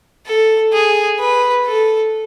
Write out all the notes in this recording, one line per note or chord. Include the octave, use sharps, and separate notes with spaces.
A4
G#4
B4
A4